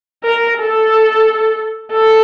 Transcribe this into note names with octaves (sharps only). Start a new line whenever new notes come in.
A#4
A4
A4